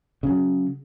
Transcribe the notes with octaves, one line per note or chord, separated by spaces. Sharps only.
C#3 F#3